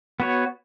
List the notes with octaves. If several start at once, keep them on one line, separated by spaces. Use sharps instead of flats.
B3 F#4 C#5